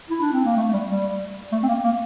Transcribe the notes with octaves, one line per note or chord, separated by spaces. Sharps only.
E4
D4
C4
A#3
A3
A3
G3
G3
A3
C4
A#3
A#3